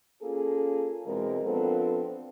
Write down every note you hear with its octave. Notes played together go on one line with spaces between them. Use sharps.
A#3 C#4 F4 G#4 A4
B2 E3 G#3 C4 A#4
F3 B3 C4 D4 F4 A4